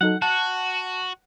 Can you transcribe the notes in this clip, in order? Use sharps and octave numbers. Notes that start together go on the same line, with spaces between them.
F#3 D#4 A4 F#5
F#4 F#5 A5